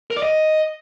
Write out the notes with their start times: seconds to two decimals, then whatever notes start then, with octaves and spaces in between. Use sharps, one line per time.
0.10 A#4
0.17 D5
0.23 D#5